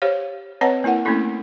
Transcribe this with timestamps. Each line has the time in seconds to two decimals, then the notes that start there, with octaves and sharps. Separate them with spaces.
0.02 G4 C5 C#5 F5
0.61 C4 B4 C#5 D#5 F#5 A5
0.84 A#3 E4 A#4 F#5
1.05 A3 A#3 C4 C#4 E4 A4